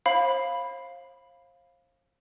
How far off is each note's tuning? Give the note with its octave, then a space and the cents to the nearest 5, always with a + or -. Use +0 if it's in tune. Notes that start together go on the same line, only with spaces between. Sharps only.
C5 +40 F5 +0 B5 +0